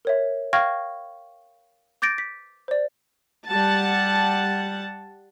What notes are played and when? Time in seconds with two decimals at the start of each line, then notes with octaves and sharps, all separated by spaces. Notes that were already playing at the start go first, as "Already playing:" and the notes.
0.05 A#4 C#5 E5
0.53 F5 G5 C#6 F6 G#6 A#6
2.02 D6 G6 A6 A#6 D7
2.18 B6
2.68 C5 D5
3.48 G3 F#5 A5